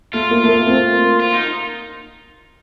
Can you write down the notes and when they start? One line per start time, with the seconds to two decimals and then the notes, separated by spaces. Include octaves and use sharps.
0.13 A3 F4
0.31 A#3
0.43 A3
0.49 A#3
0.67 A3 C4
0.93 A#3
1.20 F4
1.33 D#4